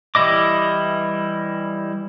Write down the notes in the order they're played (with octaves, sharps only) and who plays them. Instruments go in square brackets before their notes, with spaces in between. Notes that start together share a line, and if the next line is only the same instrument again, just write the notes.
[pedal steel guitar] E3 G3 E4 D#5 D6